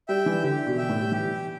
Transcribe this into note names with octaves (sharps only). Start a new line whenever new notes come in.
G3 E5 G5
E3
D3 G4
B2
E5 G5
A2
G3
E3 G4